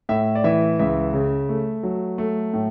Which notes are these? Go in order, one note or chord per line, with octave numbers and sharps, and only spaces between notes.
A2 E5
D5
E3 E5
C#2 E5
C#3
A3
F#3
A3
A2